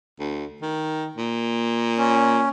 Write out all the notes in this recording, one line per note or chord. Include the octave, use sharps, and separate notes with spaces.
D2
D#3
A#2
C#4